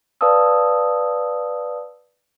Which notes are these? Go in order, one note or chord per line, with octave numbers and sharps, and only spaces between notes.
B4 D5 F5 A5 D#6 E6